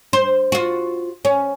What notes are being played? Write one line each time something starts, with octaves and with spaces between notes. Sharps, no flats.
C5
F4 F#4
C#4